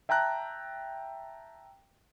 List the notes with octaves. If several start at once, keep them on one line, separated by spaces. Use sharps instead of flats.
E5 G5 A5 A#5 F#6